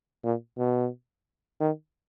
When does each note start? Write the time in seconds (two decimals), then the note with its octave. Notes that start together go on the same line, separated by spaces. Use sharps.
0.24 A#2
0.58 B2
1.60 D#3